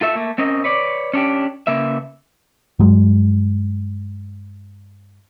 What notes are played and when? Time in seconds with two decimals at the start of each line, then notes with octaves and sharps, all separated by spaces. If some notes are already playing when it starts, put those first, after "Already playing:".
0.01 F4 A4 E5
0.15 A3 A#3
0.38 C4 C#4 A#4 D#5
0.64 B4 C#5 D5
1.13 C#4 D4 G4
1.67 C#3 A#3 B4 E5
2.79 G2 F#3 G#3